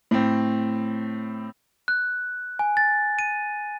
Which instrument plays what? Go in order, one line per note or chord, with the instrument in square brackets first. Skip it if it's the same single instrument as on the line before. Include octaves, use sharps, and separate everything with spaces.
[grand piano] A2 C4
[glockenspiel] F#6
G#5
A6
D#7